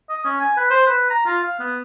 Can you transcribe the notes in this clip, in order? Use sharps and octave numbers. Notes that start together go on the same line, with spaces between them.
D#5
C#4
G#5
B4
C5
B4
A#5
F4
F5
B3